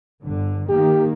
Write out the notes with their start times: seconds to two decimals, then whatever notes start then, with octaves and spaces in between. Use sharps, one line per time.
0.23 G1 D3
0.69 D#3 A#3 G4